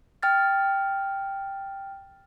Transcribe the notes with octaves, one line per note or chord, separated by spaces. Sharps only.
G5 F6 A6